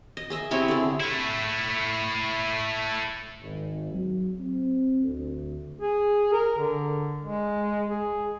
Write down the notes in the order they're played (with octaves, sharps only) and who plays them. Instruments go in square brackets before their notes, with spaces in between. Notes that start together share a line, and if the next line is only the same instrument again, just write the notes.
[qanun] D#5
G#4 D#5 E5
C3 C4 E4 C#5
D3 G#4
[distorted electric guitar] A3 E4
[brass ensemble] G#1
F#3
C4
D2
[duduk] G#4
A#4
D3
G#3
G#4